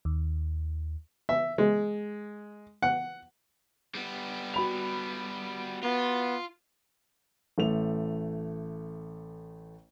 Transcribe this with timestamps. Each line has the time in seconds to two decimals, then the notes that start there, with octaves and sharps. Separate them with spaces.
0.05 D#2
1.29 E5
1.58 G#3
2.82 F#5
3.94 G3 B3
4.54 F#4 B5 F7
5.84 B3 F4
7.58 A1 A3 F7